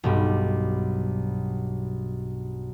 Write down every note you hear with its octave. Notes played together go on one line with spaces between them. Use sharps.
B1 G2 G3